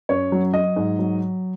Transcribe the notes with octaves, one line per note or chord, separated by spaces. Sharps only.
F#2 C#5
F#3
F#3 D#5
G#2
F#3